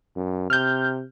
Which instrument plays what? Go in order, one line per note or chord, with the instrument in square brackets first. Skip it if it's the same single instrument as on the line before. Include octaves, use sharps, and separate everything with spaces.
[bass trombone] F#2
[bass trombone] C3 [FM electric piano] F6 G6